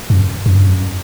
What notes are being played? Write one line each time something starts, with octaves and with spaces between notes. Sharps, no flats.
F#2
F#2
G2
F#2